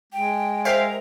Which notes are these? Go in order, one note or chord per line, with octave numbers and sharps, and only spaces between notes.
G#3 G5
A#4 C5 E5 F5 G5